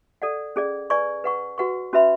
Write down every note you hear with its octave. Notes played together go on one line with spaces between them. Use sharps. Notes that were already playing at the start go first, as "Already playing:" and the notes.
A4 D5 F#5
C#4 G#4 D5
B4 D5 G#5 C#6
B4 F#5 C#6
F#4 B4 F#5 C#6
C#4 F#4 B4 E5 B5